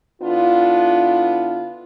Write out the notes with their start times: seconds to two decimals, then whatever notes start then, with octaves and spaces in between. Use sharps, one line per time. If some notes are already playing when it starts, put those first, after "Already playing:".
0.22 D3 B3 D4 E4 F4